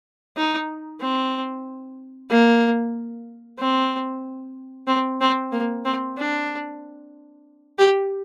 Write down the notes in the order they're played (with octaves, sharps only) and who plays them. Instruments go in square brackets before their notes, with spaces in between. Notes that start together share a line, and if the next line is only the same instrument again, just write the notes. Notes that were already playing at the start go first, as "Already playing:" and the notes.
[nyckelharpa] D#4
C4
A#3
C4
C4
C4
A#3
C4
D4
G4